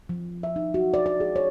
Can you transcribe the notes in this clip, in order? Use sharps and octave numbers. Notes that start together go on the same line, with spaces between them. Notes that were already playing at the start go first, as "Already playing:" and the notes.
F3
E5
D#4
F#4
D5
D5
G#4
C#5